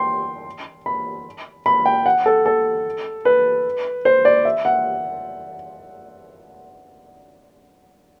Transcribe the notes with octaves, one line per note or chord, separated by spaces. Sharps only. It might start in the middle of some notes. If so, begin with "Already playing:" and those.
Already playing: G5 C6
B5
B5
G5
F#5
A4
A4
B4
C5
D5
E5
F#5